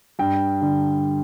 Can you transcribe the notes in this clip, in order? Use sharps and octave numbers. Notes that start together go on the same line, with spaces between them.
G2 G5
D3